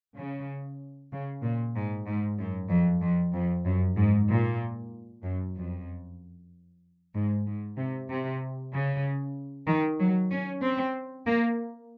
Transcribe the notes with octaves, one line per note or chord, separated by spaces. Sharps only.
C#3
C#3
A#2
G#2
G#2
F#2
F2
F2
F2
F#2
G#2
A#2
F#2
F2
G#2
G#2
C3
C3
C#3
D#3
F#3
C#4
C4
A#3